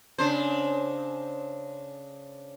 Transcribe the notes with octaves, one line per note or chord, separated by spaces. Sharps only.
C#3 D4 C5